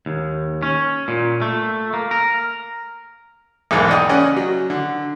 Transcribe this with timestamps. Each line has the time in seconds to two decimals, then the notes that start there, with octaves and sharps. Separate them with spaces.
0.06 D#2
0.63 C#4
1.08 A#2
1.42 A3
1.93 A#3
2.11 A#4
3.71 B1 E2 G#2 A#3
3.89 D5 D#5 G5
4.09 C#3 C#4 D5 D#5 F#5
4.36 F#3
4.70 D3